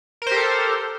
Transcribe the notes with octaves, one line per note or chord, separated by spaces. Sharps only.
G4 A4 A#4 C5